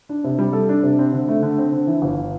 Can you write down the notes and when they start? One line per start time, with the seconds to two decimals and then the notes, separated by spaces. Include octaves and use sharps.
0.09 D4
0.24 C3
0.39 G3
0.53 A4
0.69 D4
0.83 C3
0.99 C4
1.13 D3
1.28 A3
1.42 D3
1.58 C4
1.72 D3
1.87 E3
2.02 G1